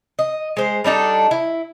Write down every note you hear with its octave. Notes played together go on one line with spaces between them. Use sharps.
D#5
G#3 C5
G3 D4 D#4 A4
E4